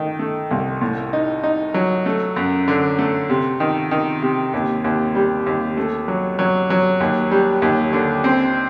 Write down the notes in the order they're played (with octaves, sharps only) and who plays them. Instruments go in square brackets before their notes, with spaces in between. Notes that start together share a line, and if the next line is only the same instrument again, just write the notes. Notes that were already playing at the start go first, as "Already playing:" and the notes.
Already playing: [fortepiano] D#3 A3
A3
C2
A2
D#4
D#4
F#3
A3
F#2
D3
A3
C3
D#3
D#3
C3
D#2
D#2
G3
D#2
A3
F#3
F#3
F#3
D#2
G3
D#2
D3
C4